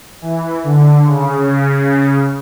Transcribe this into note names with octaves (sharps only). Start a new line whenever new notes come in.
E3
D3
C#3